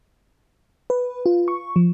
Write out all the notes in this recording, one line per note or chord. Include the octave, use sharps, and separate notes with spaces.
B4
F4
C#6
F3